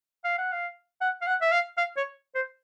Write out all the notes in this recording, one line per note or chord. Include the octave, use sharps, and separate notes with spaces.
F5
F#5
F5
F#5
F5
F#5
E5
F5
F5
C#5
C5